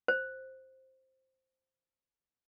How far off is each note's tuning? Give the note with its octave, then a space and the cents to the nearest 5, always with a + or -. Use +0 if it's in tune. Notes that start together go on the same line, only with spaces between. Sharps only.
C5 +5